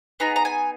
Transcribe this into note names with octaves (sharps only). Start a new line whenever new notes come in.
B3 D#4 G#4 A#5
A#5
G#5